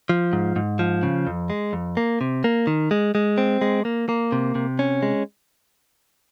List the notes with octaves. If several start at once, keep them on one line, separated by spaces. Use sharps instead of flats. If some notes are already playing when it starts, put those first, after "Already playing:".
F3
G#2
G#2
F3
C#3
F2
G#3
F2
A#3
C3
A#3
D#3
G#3
G#3
C4
G#3
A#3
A#3
C3
C3
C#4
G#3